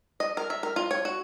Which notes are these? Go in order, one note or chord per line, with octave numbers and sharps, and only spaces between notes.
D#5
A#4
E5
A#4
F4
C#5
F#4